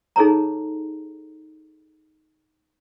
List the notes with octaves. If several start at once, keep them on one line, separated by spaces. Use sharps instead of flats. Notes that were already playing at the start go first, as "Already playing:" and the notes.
D#4 G#4 A4 C#5 A#5